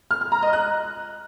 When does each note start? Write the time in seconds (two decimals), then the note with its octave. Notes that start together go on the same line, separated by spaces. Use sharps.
0.11 F6
0.21 F6
0.32 A#5
0.42 D#5
0.53 F#6